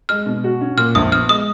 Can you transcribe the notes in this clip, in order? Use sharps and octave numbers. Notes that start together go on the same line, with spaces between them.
G#3 F6
B2
F#4
C#4
A#2 F6
A#1 D#6
B3 F6
G#3 D#6